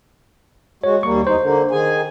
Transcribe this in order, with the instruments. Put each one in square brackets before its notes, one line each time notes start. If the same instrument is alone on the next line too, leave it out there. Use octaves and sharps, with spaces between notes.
[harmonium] G#3 F#4 [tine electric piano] C#5
[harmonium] D#2 G3 A#3 [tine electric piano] C#6
[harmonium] E2 D#4 [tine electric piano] C5
[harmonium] D3 A#3
D#3 G#4 G#5